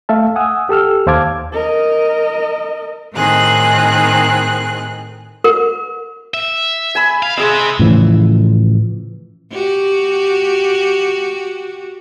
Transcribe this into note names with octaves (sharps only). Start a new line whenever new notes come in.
A3 E5 F5 A5
F#5 G#5 D#6 E6
G4 A4 E6 F6
D#2 C5 F5 A5 D6 G#6
A#4 D#5
A2 D#3 C4 D#4 G#4 F#6
A#4
E5
G#5 B5
F5
G#3 C4 G#4 D#5 E5
A2 C#3 E3 F3
F#4 G4